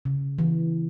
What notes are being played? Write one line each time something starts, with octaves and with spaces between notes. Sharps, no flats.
C#3
E3